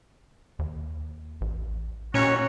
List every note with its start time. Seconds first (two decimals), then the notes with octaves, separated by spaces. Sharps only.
0.59 D#2
1.41 A1
2.14 D#2 A#2 C#4 F#4 C#5